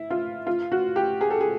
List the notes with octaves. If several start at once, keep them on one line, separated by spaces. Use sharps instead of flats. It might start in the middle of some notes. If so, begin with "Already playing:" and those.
Already playing: E4
F4
F4
F#4
G4
G#4
A4
G#4